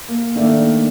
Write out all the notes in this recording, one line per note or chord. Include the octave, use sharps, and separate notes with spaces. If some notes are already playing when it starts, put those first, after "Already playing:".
A#3
D#3 A3 A#3 D4